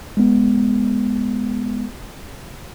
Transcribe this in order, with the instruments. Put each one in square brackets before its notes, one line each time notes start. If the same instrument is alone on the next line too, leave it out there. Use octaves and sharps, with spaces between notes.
[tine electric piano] G#3 B3